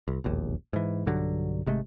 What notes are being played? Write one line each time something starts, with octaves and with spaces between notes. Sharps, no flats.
C2
E1 A#1 D#2
G#2 E3
B1 G2 D3 F#3
G#1 C3 G#3 A3